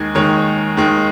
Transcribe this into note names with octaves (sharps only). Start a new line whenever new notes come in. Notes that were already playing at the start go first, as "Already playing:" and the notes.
Already playing: D#2 D#3 G#3 G#4
D#2 D#3 G#3 C#5
D#2 D#3 G#3